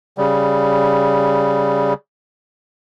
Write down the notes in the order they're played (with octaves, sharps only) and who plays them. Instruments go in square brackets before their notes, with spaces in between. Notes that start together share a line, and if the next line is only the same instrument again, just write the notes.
[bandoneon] C#3 G3